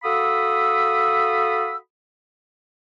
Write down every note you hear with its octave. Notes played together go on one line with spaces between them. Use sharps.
F#4 A4 F5 B5 D#6 E6